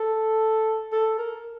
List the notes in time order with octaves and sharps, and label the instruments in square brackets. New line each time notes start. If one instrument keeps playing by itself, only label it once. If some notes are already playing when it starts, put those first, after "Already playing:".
Already playing: [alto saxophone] A4
A4
A#4